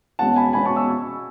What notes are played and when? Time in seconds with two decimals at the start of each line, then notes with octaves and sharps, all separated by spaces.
0.19 E2 B2 G#3 C#4 F#5 A5
0.36 G#5 B5
0.53 E2 B2 G#3 C#4 G#5 B5
0.66 A5 C#6
0.76 C#6 E6